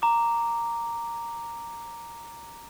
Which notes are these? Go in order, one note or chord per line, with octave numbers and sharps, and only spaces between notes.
A#5 D6